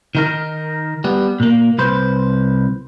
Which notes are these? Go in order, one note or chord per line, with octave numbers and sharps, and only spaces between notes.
D#3 D#4 A#4
G3 B3
A#2 A#3
C2 B4 C5